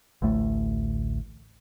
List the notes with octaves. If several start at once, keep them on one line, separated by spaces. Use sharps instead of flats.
A1 D2 A2 A3